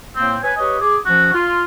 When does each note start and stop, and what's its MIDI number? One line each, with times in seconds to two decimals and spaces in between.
0.16 0.36 45
0.16 0.36 58
0.16 0.36 60
0.42 0.52 71
0.42 0.52 73
0.42 0.52 80
0.57 0.76 67
0.57 0.76 71
0.57 0.76 73
0.57 0.76 75
0.80 0.96 68
0.80 0.96 86
1.05 1.30 53
1.05 1.30 61
1.05 1.30 66
1.33 1.64 65